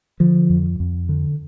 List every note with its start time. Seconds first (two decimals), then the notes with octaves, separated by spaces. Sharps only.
0.20 D3 F3
0.50 F2
0.80 F2
1.09 D3